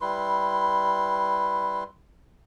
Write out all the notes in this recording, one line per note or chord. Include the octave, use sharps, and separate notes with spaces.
G3 E4 B4 C6